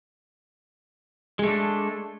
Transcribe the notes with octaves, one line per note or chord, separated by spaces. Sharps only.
G#3 A3 D4